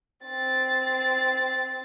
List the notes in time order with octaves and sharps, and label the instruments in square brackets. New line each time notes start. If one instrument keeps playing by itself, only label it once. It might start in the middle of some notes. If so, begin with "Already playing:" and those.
[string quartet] C4 A6